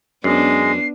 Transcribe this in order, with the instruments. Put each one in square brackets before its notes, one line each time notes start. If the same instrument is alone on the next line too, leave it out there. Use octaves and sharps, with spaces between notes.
[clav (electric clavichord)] F#2 [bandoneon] G#3 [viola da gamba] B3 D4 [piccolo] C7